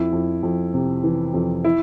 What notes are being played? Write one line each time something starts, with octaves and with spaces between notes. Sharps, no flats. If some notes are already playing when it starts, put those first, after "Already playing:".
Already playing: F2 E4
F2
F2
C3
E3
F2
E4